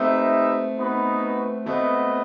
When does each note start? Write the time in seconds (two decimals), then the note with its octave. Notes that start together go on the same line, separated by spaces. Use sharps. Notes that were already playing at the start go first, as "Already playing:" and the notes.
Already playing: A3 C4 D#4 G4 B4 E5
0.77 B3 D#4 F#4 B4
1.65 A3 B3 C4 F#4 B4 D#5